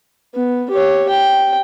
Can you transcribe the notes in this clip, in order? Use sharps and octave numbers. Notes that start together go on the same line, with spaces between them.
B3
G4 C#5
G5